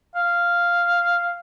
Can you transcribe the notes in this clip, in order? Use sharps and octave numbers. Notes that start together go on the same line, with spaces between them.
F5